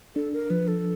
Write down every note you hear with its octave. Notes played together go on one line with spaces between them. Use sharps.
D4 A4
A#4
F3 B4
A4